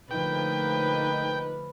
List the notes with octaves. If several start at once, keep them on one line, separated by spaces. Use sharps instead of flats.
D3 F3 A3 A#3 D#4 B4 G5